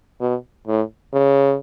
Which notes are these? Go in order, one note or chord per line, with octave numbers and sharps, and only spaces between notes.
B2
A2
C#3